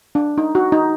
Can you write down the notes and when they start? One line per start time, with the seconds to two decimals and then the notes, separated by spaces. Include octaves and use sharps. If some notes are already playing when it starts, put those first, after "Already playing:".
0.15 D4
0.38 D#4
0.55 F#4
0.72 D#4